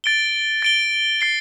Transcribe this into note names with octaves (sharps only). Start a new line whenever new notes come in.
A6 D7 G7
A6 D7 G7
A6 C7 G7